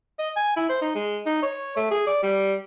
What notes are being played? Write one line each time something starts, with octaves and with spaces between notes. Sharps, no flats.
D#5
G#5
E4
C5
D#4
G#3
D#4
C#5
A3
G#4
D5
G3